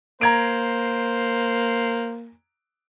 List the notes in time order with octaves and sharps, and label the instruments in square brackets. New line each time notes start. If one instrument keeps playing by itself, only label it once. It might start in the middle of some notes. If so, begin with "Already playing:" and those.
[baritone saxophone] A#3 [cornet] C5 [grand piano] A#5 G#6 D7